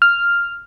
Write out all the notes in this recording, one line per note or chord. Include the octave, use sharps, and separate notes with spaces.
F6